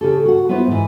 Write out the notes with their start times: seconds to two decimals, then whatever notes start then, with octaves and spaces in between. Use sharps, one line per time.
0.01 C#3 G4 A4
0.25 F#4 F#5
0.49 B3 E4 F4 B4 C5
0.67 G#2 E3